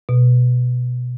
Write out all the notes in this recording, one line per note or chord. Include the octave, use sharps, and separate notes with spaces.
B2